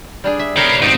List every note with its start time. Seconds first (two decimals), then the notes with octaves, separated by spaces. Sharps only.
0.24 G3 D4 G#4
0.39 E5
0.57 G4 A#4 C#5 B5
0.69 B4
0.82 G#2 C4 D#4